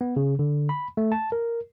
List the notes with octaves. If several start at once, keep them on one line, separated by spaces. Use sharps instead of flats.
B3
C#3
D3
B5
A3
A5
A#4